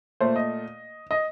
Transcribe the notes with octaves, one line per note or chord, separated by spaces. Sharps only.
A#2 A3 C5
D#5
D#5